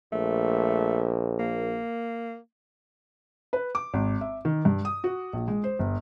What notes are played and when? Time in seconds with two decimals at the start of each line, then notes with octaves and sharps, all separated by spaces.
0.12 A#1 A3
1.39 A#3
3.53 B4
3.75 D6
3.94 G#1
4.21 E5
4.45 D#3
4.65 G2
4.85 D#6
5.04 F#4
5.33 A#1
5.48 G#3
5.64 C5
5.79 G1